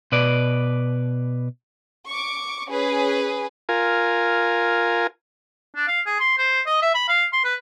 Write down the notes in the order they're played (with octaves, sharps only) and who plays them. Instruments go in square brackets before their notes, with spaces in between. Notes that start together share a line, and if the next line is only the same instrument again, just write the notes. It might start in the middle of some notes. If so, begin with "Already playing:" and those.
[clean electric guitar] B2 B4 D5
[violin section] C#6 D6
C#4 G#4 B4
[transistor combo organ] F4 A#4 G#5
[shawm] D4
F5
G#4
C6
C5
D#5
E5
B5
F5
C6
B4